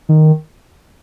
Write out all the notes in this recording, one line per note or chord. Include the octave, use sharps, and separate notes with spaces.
D#3